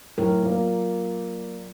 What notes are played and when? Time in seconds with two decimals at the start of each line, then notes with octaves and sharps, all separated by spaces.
0.18 A2 F#3 A#4
0.42 A#2 A#3